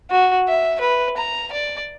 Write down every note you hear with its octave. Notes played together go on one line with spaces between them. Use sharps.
F#4
E5
B4
A#5
D5